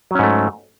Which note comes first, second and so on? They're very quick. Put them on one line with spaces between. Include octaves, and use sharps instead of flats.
F#3 C#4 G#2 A3